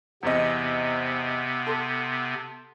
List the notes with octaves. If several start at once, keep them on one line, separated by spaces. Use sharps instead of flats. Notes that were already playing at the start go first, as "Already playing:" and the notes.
E2 C3 B3 C4 D#5
A4 C6